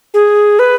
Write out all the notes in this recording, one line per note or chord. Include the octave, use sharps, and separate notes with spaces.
G#4
B4